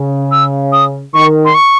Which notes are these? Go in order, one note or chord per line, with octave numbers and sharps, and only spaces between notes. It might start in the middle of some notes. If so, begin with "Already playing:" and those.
Already playing: C#3
E6
D#6
D#3 C#6
C6
C#6